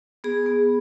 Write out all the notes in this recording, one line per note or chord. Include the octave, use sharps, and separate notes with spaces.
B3 G#4
B3